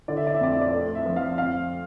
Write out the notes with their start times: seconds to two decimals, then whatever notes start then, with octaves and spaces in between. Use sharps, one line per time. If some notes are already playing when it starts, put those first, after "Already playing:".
0.08 D3 D5
0.17 E5
0.27 D5
0.35 E5
0.41 F2 D5
0.53 E5
0.61 D5
0.73 A3 D5
0.95 E5
1.06 F3
1.16 F5
1.38 F2 F5